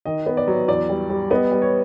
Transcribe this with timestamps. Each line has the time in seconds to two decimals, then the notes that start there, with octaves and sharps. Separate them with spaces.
0.05 D#3 D#5
0.26 B3
0.37 D5
0.48 F#3
0.68 E2 D5
0.89 G3
1.10 G3
1.30 B3 D#5
1.51 G3
1.62 C#5